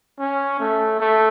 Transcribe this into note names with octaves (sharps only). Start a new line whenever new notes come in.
C#4
A3
A3